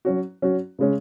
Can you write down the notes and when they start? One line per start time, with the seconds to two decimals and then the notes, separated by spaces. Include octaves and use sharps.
0.05 F#3 C#4 F#4
0.42 F#3 C#4 F#4
0.79 C#3 G#3 C#4